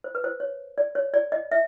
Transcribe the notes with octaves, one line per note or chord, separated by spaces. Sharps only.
C5
B4
C5
C#5
D5
C#5
D5
D#5
E5